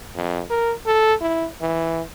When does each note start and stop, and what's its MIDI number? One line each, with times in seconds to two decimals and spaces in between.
0.15 0.42 41
0.50 0.73 70
0.86 1.14 69
1.21 1.47 64
1.61 2.01 52